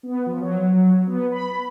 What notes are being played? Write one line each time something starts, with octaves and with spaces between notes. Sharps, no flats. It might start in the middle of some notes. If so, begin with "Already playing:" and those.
B3
F3
F#3
B3
B5